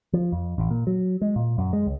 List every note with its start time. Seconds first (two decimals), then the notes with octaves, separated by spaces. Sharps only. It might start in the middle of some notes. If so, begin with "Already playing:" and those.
0.13 F3
0.32 F2
0.58 A1
0.71 A#2
0.87 F#3
1.21 G#3
1.36 A#2
1.58 F#2
1.73 G#3
1.86 C#2